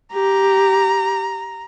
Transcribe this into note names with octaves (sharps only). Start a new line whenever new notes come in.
G4 A#5